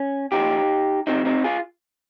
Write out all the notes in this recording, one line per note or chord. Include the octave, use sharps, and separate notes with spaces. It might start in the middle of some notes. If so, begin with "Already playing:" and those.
Already playing: C#4
A#2 F3 D#4 G4
C3 F3 C4 D#4
C4 D#4
F4 G#4